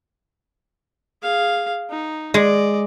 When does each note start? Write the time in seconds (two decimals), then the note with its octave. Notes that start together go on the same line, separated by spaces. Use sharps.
1.22 G#4 F5
1.90 D#4
2.34 G#3 D5 D#5